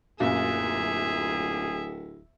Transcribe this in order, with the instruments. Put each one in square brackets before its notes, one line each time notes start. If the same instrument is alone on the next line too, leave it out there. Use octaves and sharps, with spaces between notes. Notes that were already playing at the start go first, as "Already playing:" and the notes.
[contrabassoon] D1 [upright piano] F#2 A#2 F4 [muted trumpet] G#4 [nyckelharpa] E5